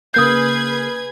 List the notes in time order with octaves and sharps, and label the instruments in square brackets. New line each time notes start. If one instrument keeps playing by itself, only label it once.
[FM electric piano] C#3 A#3 C7 [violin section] G#4 B4 G#6 [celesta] D#6 G6